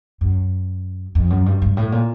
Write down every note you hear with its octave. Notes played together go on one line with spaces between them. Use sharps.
F#2
F2
F#2
G2
G2
A2
A#2